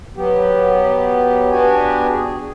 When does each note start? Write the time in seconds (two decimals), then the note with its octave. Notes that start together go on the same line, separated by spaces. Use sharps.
0.16 F#3 B3 G4
1.51 B3 D4 F#4 G4 G#5
2.10 G#4